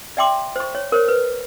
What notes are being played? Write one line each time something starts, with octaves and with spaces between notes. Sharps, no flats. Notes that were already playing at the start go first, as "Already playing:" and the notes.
D5 E5 G5 C6 D6
C5 C#6
C#5
A#4 C5 C#5
B4